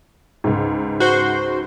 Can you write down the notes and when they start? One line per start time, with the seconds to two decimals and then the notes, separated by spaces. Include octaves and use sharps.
0.44 C#2 G#2
1.00 F#4 C5